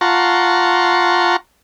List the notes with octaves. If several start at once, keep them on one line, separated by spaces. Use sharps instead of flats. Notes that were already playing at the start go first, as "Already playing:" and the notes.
F4 F#5 A5 A#5 C6 C#6